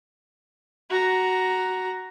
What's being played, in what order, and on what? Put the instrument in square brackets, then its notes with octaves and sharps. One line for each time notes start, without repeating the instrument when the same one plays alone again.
[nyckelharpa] F#4 A#5